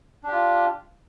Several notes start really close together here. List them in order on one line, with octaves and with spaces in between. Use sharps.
D4 G4 F4